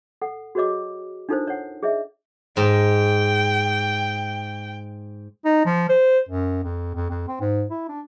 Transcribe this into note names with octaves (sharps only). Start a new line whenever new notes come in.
A4 F#5
F#4 G#4 B4 C#5 D#5 D6
D4 D#4 F4 A4 A#4 C5
C#5 F#5
G#4 C#5 D#5 E5
G#2 G5
D#4
F3
C5
F#2
F2
F2
F2
C4
G#2
E4
D4